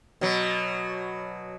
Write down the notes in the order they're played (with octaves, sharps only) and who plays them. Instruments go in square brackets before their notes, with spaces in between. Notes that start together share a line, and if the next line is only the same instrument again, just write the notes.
[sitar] B2 F#3